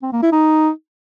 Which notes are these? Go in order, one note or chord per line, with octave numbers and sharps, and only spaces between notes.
C4
A#3
E4
D#4